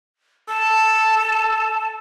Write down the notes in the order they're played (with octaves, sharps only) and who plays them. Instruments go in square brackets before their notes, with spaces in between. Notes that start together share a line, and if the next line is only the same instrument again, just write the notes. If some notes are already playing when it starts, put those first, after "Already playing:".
[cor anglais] A4 [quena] A5